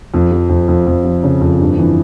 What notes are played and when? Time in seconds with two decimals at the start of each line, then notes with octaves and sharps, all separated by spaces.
0.14 F2
0.31 F3
0.50 F2
0.68 F2
0.87 F2
1.04 F3
1.23 C#3
1.41 F2
1.59 G2
1.78 E3